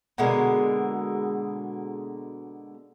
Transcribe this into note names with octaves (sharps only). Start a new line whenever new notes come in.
B2 D3 G#3 A#3